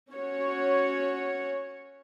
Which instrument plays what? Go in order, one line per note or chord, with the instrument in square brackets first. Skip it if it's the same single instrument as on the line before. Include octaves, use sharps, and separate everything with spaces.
[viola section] C#4 F#4 C#5